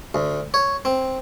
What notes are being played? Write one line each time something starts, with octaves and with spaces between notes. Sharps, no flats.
D2
C#5
C4